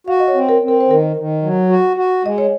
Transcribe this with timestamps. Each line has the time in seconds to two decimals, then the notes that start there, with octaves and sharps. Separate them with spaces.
0.07 F#4 F5
0.20 D#5
0.28 C#5
0.34 C4
0.49 A#4
0.62 C4
0.68 A#4
0.81 C5
0.88 D#3 A#4
1.16 D#3
1.42 F#3
1.69 F#4
1.97 F#4
2.25 G#3 D#5
2.38 C#5